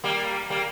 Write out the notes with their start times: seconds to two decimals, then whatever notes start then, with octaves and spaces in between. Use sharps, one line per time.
0.04 G3 A#3
0.50 G3 A#3